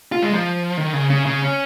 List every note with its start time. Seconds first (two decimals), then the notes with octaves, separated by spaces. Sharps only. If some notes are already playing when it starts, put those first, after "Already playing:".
0.12 F4
0.22 G#3
0.33 F3
0.77 D#3
0.93 C#3
1.10 C#3
1.26 C#3
1.42 C#4